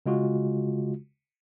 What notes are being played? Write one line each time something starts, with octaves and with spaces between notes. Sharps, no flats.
C#3 G#3 F4 F#4